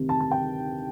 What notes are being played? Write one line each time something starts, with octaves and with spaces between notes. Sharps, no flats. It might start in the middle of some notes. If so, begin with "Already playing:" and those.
Already playing: D2 C3 D#3
A5
A5
G5